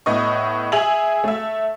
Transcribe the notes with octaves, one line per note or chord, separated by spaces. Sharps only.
A2 B3 D#5 C#6
G#4 E5 G#5 F7 F#7
A3 E5